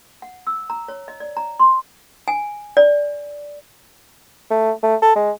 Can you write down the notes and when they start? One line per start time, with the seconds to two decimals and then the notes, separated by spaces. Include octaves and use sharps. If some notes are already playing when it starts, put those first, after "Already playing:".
0.22 F#5
0.47 E6
0.70 A#5
0.88 C#5
1.08 D#5
1.20 D5
1.37 A#5
1.60 C6
2.28 G#5
2.77 D5
4.51 A3
4.83 A3
5.02 A4
5.16 G#3